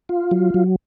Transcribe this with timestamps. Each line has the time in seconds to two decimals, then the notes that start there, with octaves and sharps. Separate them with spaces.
0.09 F4
0.31 F#3
0.54 F#3